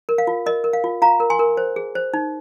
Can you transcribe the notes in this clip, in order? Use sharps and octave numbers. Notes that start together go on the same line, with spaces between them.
A#4
F5
F4
A#4 D#5
A#4
F5
F4
F4 F5 A#5
A#4
G#5 C6
A#4
C5
G#4
C5
D#4